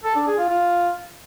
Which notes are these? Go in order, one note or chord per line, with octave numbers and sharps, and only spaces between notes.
A4
D4
G#4
F4
F4